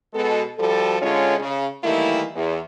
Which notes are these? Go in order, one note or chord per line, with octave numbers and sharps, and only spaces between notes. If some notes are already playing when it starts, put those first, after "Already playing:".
B2 G#3 A4
F3 G3 F#4 A4
D3 G#3 C#4 F4 C#5
C#3
D#3 E3 G3 A3 A#3 E4
E2